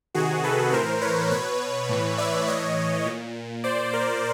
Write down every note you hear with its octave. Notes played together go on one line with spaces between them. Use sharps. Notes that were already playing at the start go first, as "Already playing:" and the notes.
C3 D#3 F#4 G#4
A4 B4
A2 E3 A#4 C5
B4 C#5
B2 B4 C#5
A2 E3
D5 E5
A2 E3 C#5 D#5
A#2
A#2 C5 D5
A#4 C5